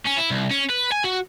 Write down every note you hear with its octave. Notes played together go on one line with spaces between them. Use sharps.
C#4
E4
C2
C#4
B4
G#5
F#4